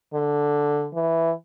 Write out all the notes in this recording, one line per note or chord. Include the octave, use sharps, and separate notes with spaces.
D3
E3